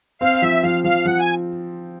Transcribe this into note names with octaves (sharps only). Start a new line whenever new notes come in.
C4 F5
F3 E5
F3 F5
F3 F5
F3 F#5
G#5